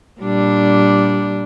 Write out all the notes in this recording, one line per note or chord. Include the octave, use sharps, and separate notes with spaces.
A#2 G3 D4